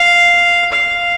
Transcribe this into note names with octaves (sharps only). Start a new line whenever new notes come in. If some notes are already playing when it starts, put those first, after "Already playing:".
Already playing: F5
F5